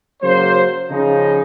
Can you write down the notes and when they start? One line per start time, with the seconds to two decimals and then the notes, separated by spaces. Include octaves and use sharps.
0.22 C#3 F#3 A#3 F#4 C5
0.90 C#3 F3 D#4